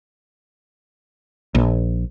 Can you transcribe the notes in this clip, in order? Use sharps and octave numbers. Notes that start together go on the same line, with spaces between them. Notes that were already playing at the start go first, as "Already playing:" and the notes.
A#1